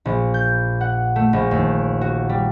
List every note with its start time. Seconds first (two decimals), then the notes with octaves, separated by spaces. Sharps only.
0.05 A#1
0.34 G6
0.81 F#5
1.16 A3
1.33 A#1
1.51 D#2
2.01 F#4
2.29 G3